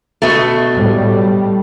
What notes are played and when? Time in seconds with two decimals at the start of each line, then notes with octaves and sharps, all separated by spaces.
0.22 B2 A3
0.74 A2 G3